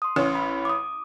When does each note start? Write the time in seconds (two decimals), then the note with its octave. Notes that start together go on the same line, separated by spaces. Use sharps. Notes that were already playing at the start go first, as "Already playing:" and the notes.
0.02 C6 D#6
0.16 A1 C#4
0.35 B5
0.65 D6 D#6